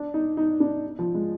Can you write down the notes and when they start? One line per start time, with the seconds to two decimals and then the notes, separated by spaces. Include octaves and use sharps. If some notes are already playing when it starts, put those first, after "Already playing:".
Already playing: D4
0.14 D#4
0.37 D#4
0.60 D4
0.99 F3
1.14 G#3